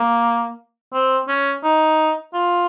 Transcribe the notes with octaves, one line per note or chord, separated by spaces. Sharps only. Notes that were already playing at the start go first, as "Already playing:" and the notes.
Already playing: A#3
C4
C#4
D#4
F4